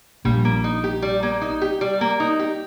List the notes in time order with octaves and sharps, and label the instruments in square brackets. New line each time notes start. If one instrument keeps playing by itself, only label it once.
[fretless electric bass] A#1 A#2 [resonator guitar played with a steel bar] G3
[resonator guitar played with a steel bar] A#3
D#4
G4
G3
A#3
D#4
G4
G3
A#3
D#4
G4